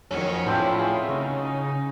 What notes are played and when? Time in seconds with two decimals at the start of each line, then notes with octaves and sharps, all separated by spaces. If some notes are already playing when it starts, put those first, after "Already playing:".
0.11 F2 D#3 F#3 C#4 C#5
0.46 A2 C4 D4 E4 F4 C5
0.79 G#4 C#6
1.09 C#3 D#4 C#6